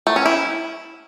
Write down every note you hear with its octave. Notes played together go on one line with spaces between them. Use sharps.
A3
C#4
E4